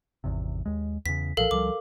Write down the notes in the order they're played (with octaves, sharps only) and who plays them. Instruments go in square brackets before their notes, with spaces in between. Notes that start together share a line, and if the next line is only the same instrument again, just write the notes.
[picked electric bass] G#1 E2 C3
D#2 G#3
[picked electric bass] E2 C#3 [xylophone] B6
[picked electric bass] B1 A#2 F3 [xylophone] A4 A#4 F5
[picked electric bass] C#2 F3 G3 [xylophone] D6